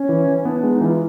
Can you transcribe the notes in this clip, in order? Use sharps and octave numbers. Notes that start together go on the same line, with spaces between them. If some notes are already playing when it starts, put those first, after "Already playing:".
Already playing: C#4
E3
E3
B3 D4
G#3 D4
D#4
E3 F4